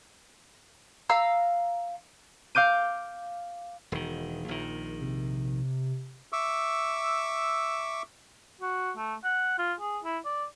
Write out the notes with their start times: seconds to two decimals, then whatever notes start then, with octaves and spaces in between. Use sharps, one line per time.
1.09 F5 A#5 E6
2.55 F5 D6 G6 D#7
3.92 E1 D#3
4.48 A#1 D#3
5.01 C3
6.33 E5 C#6 D6 E6
8.61 F#4
8.97 A3
9.24 F#5
9.59 F4
9.80 G#4
10.04 E4
10.25 D5